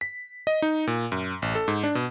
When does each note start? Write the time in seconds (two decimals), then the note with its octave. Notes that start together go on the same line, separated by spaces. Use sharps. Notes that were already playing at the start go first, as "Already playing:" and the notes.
0.01 B6
0.47 D#5
0.62 D#4
0.87 A#2
1.12 F#2
1.42 A1
1.55 A4
1.68 G#2
1.84 D4
1.95 B2